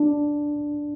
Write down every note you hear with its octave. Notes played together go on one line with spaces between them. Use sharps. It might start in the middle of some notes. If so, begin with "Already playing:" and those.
Already playing: D4